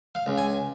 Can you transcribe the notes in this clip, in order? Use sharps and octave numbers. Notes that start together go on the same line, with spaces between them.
F5
C#2
G#5